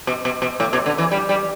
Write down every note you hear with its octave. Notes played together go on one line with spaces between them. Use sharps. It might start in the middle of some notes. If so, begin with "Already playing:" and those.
B2
B2
B2
A2
B2
D3
E3
G3
G3